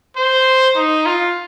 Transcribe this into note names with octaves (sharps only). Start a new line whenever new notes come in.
C5
D#4
F4